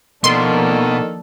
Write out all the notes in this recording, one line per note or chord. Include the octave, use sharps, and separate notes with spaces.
B2 D#3 F3 A#3 D4 A4 C6